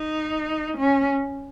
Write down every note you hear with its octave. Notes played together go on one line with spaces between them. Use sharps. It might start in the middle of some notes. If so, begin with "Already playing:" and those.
Already playing: D#4
C#4